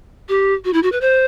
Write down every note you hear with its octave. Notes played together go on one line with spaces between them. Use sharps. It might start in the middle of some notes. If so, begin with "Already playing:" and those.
G4
F#4
E4
F#4
B4
C5